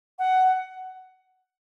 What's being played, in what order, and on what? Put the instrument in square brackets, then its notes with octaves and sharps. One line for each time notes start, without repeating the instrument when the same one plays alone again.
[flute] F#5